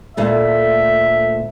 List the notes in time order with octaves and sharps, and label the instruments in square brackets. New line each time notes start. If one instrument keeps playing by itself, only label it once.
[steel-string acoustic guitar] D2 A#2 A3 [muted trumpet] E5